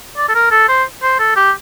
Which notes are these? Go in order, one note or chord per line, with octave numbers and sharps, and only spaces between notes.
D5
A4
A#4
A4
C5
C5
A4
G4